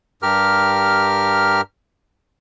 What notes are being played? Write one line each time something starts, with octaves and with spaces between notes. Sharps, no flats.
G2 G4 A#4 F6